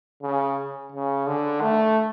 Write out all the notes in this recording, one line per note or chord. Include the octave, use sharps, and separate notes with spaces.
C#3
C#3
D3
A3